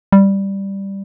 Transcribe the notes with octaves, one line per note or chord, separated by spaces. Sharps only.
G3